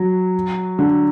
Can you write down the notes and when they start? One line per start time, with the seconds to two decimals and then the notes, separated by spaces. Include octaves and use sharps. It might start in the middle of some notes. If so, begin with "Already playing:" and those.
Already playing: F#3
0.79 D3